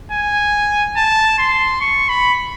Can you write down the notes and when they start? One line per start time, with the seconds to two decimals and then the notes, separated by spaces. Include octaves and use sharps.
0.12 G#5
0.97 A5
1.39 C6
1.81 C#6
2.09 B5